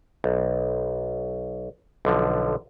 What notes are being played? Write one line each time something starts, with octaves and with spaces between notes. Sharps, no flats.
B1
B1 D3 F3